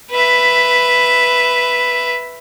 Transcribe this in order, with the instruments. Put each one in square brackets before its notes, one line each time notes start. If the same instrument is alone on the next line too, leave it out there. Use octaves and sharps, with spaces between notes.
[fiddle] B4 E5